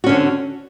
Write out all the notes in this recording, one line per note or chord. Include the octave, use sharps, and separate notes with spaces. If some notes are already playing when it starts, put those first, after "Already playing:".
D3 C4 C#4 F#4